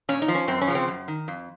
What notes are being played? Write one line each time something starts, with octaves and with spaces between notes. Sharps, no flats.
A#2 C#4
D#4
F3
C#4
F#2 C4
C#4
C#3 F3
C4
F#2
D#3
F2